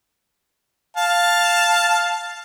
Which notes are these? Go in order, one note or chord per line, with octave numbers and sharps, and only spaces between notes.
F5 A5